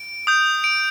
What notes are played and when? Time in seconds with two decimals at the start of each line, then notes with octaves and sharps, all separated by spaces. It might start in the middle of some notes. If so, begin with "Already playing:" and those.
Already playing: D7
0.27 D#6 G6
0.64 D7